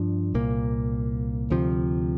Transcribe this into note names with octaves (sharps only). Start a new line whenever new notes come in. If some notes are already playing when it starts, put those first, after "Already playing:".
Already playing: G2 F3 D4
C2 A#2 A#3
D2 C3 F3